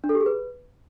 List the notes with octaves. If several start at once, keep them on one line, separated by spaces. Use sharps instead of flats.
D4
A4
G4
G#4
B4